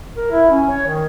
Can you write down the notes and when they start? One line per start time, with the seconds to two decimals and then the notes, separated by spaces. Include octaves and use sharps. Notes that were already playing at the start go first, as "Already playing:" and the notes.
0.16 A#4
0.32 E4
0.51 C#4
0.70 C#5
0.87 D#3